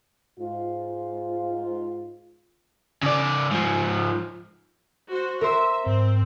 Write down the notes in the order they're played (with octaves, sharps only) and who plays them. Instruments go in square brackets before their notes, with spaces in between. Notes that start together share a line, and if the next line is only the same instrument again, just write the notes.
[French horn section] G#2 F4
[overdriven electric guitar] C#3 D5
G#2 F3
[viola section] F#4 C5
[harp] A#4 C5 [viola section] E5
[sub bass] G#2 [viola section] C4